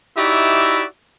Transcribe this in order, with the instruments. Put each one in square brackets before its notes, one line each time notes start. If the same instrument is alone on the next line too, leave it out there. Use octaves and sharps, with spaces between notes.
[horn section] D#4 E4 F#4 G4 D5 E5